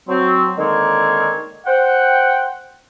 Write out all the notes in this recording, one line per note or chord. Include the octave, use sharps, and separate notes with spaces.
F#3 C4
D3 D#3 G#3 A#3 C4 C#5
C5 F#5 G5